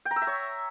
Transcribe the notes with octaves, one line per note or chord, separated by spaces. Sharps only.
G5
A#5
E6
E5
C#5